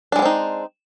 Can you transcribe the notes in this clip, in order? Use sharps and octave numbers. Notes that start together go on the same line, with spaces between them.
G3 G#3 C4 D4 D#4